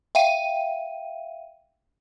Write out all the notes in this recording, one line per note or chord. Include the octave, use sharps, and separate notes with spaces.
E5 F5 G5 D#7